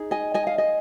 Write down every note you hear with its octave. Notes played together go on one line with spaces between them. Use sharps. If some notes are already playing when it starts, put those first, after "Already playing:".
Already playing: D#4 G#4
D#5 G#5
D#5 G#5
F5
D#5 G#5